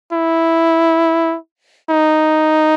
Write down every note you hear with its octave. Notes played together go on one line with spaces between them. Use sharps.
E4
D#4